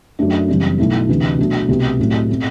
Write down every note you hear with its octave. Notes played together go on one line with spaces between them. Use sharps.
F#2 F#3 A3 D4
F#1 F#2 E3 G3 C4
B1 B2 A3 E4
D2 C3 E3
B2 F#3 A3 D4 F#4
C2 B2 A3 C4 G4
A2 F#3 A3 C4 G4
B2 A3 C4